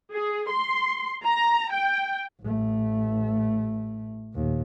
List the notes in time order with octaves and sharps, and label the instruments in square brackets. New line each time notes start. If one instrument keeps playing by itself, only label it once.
[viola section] G#4
C6
A#5
G5
[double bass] A1 A3
D#2 A#2